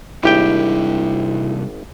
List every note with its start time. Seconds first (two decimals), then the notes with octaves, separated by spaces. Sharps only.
0.23 G#1 C3 G3 D4 E4 G4 G5